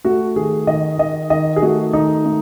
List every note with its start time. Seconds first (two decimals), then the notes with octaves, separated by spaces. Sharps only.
0.05 A3 F#4
0.36 D#3 G#4
0.67 D#3 D#5
0.98 D#3 D#5
1.30 D#3 D#5
1.56 G#4
1.62 A3 F#4
1.93 D#3 D#4
2.25 A3